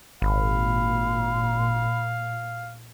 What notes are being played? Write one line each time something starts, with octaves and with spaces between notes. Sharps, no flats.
G#1 A#2 F5 B5